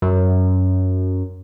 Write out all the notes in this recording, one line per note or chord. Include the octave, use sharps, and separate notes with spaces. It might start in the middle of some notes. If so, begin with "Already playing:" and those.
F#2